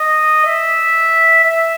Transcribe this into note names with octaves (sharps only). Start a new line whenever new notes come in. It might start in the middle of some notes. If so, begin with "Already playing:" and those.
Already playing: D#5
E5
E5